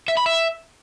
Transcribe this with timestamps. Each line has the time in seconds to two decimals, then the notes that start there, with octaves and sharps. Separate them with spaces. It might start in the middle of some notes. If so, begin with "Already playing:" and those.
0.08 E5
0.17 B5
0.26 E5